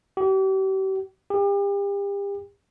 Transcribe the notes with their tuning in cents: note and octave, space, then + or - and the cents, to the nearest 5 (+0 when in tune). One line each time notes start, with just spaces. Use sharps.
G4 -40
G4 +35